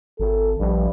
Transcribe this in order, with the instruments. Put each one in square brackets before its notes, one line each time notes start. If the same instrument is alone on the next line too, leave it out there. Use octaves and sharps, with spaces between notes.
[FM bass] G#1 [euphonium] A4
[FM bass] A#1 [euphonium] G2